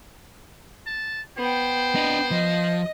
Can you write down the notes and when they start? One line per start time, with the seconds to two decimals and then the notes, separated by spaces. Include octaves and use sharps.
0.86 A5
1.38 B3 C5 G5
1.95 D4 D#5
2.31 F3 D#5